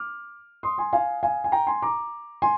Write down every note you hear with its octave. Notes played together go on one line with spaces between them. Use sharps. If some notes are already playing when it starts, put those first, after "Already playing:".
Already playing: D6 F6
C6 D#6
G#5 C6
F5 G#5
F5 G#5
G#5
G5 A#5
G#5 C6
A#5 D6
G#5 C6